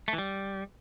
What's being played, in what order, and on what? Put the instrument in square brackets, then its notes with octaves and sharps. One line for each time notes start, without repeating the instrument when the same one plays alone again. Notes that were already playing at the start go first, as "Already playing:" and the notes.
[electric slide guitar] A3
E3
G3